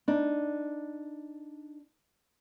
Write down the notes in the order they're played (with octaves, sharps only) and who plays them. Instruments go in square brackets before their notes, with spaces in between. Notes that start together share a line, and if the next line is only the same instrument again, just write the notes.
[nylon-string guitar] D4 D#4